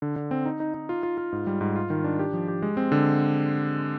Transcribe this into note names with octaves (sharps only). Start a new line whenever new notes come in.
D3
D3
C4
D#4
D#4
D#4
F4
F4
F4
G#2
G3
G#2
F4
D#3
D4
G4
F3
G4
G#3
C4
D3